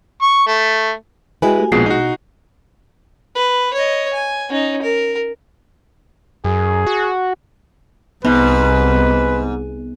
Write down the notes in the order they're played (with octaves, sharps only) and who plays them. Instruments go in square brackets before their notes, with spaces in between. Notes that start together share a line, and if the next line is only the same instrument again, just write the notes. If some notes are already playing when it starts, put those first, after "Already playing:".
[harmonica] C#6
A3
[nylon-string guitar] G#3 E4 B4 [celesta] F#4 G#5 [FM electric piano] G#4 D#5 G5
[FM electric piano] A3 G4
[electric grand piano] A#1 B2 G#4 [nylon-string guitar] G#3 [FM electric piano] A#3 C4 F4 [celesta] C7
[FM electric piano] B2 [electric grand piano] D#4 F#4
[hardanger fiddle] B4
C#5 D#5
G#5
C#4 D#4
A#4
[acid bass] F#2 [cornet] G#4
[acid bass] F#4
[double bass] C2 [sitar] G#2 [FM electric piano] B3 [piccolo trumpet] B4